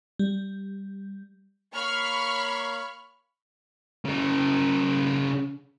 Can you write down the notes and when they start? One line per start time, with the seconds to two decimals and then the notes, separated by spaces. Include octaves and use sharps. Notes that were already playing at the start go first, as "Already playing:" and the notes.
0.19 G3
1.75 A#3 C#5 F5 B5 C#6 F6
4.05 C#3 A#4